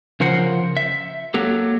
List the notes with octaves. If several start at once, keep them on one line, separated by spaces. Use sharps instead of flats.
C#3 F3 A#4 C5 F#5
E5
F#3 A#3 G4 A4